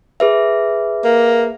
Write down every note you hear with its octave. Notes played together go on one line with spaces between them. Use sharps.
G#4 B4 E5
A#3